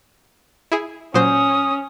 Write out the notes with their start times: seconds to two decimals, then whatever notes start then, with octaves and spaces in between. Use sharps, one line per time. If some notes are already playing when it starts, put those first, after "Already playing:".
0.72 E4 G#4
1.14 A#2 F#3 C#4 C5 D#6